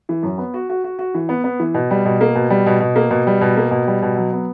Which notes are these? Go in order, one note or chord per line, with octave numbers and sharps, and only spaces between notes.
E3
F#2
B3
F#4
F#4
F#4
F#4
E3
B3
B3
E3
B2
G3
B2
A#3
B2
G3
B2
B2
A#3
B2
G3
B2
A#3
B2
G3
B2
F#3
B3